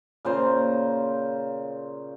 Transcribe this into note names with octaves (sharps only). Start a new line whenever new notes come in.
A#2 C#3 C5 A#5